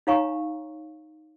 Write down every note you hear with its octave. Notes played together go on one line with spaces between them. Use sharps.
D#4 C#5 F5 G#5 A#5 C#6